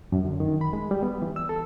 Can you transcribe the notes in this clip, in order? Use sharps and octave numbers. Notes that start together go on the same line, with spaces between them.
F#2
D3
D#3
B5
G#3
G3
B3
E3
E6
A4